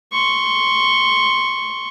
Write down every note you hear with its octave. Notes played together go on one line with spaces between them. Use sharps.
C6 C#6